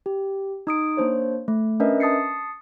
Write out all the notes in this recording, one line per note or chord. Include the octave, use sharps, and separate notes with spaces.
G4
D#4 D#6 D7
A#3 D4 C5 C#5
A3
C#4 D4 A#4 B4 D#5 E5
A5 D#6 A6 C7 C#7